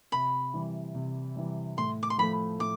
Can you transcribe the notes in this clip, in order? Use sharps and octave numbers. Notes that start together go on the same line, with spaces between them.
C3 B5
E3 G3
C3
E3 G3
A2 C6
D6
C6
F3 A3 B5
A2 D6